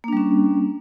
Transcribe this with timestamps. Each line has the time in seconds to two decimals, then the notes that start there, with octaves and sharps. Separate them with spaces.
0.04 A#3
0.08 D4
0.13 G3
0.17 C#4